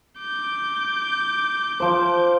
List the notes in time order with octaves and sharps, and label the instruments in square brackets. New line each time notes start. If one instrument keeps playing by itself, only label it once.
[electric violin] D6 G6
[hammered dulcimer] F3 C5